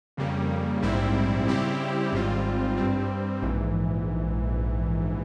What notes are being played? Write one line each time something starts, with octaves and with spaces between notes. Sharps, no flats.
F2 C#3 G3 A#3
A#1 G#2 G3 C4 E4
C#3 G3 C4 E4 G4
G#1 G#2 G3 C4 F4
G2 G3 C4
A#1 G#2 E3